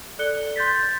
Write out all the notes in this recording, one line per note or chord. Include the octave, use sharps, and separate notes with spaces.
A4 D5 F#6 C#7 G7
C6 G6 A6 B6